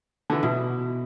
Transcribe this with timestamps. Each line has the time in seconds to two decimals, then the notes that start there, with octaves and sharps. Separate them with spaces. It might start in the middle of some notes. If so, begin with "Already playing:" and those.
0.30 D3 E3
0.43 B2 E4